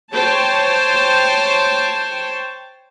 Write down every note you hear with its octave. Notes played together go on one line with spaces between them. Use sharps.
C5 C#5 G5 A5